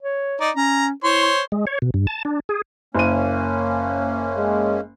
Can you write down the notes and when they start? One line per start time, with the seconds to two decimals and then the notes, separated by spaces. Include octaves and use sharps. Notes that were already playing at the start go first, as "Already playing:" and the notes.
0.03 C#5
0.40 D#4 D5
0.56 C#4 A#5
1.04 E4 C5 C#5 C6
1.52 G#3
1.67 C#5
1.82 B2
1.94 G2
2.07 A5
2.25 D4
2.49 G#4
2.95 F#1 A#3 C#4 D#7
4.38 G#3